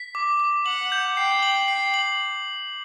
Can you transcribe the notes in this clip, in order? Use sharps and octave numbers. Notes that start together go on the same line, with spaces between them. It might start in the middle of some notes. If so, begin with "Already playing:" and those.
Already playing: B6
D6
D6
F#5 F#7
G6
G5 C7
F#7
C7
F#7